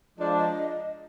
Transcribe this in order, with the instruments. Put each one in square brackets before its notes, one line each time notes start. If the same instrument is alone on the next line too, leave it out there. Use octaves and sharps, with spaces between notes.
[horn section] F3 G#3 D4 [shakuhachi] D#5
[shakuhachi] F5
D#5